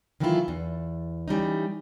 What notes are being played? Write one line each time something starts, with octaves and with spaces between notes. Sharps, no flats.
D#3 E3 F#3 A3 E4 F4
E2
E3 G3 C#4 D#4